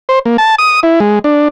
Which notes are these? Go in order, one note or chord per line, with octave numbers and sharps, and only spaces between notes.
C5
A#3
A5
D#6
E4
G#3
D4